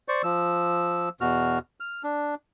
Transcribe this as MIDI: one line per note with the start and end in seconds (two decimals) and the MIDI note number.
0.08 0.22 72
0.08 0.22 74
0.08 0.22 85
0.24 1.09 53
0.24 1.09 88
1.21 1.59 40
1.21 1.59 47
1.21 1.59 66
1.21 1.59 89
1.80 2.02 89
2.04 2.35 62